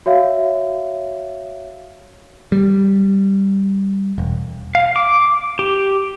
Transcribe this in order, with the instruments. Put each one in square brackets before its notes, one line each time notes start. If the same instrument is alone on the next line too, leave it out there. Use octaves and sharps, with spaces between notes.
[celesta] F#4 C#5 E5 F5
[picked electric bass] G3
E1
[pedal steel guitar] F5
D6
G4